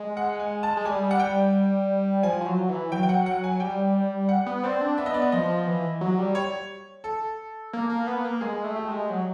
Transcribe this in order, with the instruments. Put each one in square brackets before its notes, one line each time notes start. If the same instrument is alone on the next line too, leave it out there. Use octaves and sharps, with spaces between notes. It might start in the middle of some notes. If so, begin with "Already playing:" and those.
Already playing: [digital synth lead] G#3
[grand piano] F#5
G#5
A5
[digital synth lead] G#3
[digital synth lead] G3 [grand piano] G#5
[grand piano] F#5
G5
[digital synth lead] F3 [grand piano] G#5
[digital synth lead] F3
F#3
E3
[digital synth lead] F#3 [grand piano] G5
[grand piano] G5
F#5
F#5
G#5
[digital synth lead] G3 [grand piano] G5
[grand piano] F#5
[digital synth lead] B3
[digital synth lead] C4 [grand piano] D5
[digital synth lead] D4
[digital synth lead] B3 [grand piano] E5
[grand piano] D#5
D5
D#5
[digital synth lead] F3 [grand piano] D#5
[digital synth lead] E3
F#3
G3
[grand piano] C#5
A4
[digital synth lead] A#3
A#3
B3
A#3
[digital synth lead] G#3 [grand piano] G#4
[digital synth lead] A3
[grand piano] G4
[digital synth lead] G#3
F#3